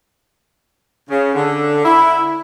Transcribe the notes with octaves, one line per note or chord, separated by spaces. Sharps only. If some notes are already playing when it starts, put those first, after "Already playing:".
C#3
D3
E4